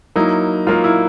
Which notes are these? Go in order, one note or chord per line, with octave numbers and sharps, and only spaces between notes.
F#3 A#3 D#4 E4
F#3 A#3 D#4 F4
E4